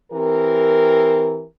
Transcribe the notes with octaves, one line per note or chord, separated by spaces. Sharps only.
E3 C4 G4 A#4